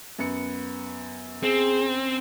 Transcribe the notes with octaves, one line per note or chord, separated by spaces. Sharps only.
F#2 B3 C#7
C4 G#4